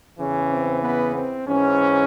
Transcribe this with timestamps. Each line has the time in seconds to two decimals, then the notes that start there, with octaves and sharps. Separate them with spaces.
0.18 E2 C#3 E3 C#4
0.50 C4
0.82 B3
1.15 C4
1.47 G#2 E3 C#4